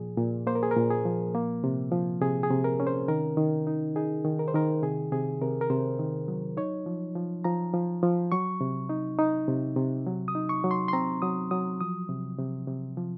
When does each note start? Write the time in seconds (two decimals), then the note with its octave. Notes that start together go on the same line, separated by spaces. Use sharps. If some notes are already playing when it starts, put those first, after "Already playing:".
Already playing: A#2 F3 G#4
0.17 A#2
0.47 A#3 C5
0.55 A#4
0.63 G#4
0.71 A#4
0.76 A#2
0.90 G#4
1.05 F3
1.35 A#3
1.64 C3
1.92 F3
2.22 C3 G#4
2.43 G#4
2.51 C3
2.64 A#4
2.80 C#4
2.87 C5
3.08 D#3 A#4
3.37 D#3
3.67 D#4
3.96 D#4 G#4
4.25 D#3
4.39 A#4
4.48 C5
4.54 D#3 A#4
4.83 C3 G#4
5.12 C3 G#4
5.41 C3 A#4
5.61 A#4
5.70 C3 C5
5.99 D#3
6.28 F#3
6.57 D#4 C#5
6.86 F3
7.15 F3
7.44 F3 A#5
7.74 F3
8.03 F3
8.32 F#3 C#6
8.61 C3
8.89 D#4
9.19 D#4
9.48 C3
9.76 C3
10.06 F#3
10.28 D#6
10.35 D#4
10.49 C#6
10.64 F#3
10.71 C6
10.88 C6
10.93 C4 A#5
11.22 F#3 D#6
11.51 F#3 D#6
11.81 F3 D#6
12.09 C3
12.39 C3
12.68 C3
12.97 F3